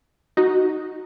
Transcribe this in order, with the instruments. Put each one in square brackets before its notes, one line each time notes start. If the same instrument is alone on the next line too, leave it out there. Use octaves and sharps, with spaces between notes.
[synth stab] D#4 F#4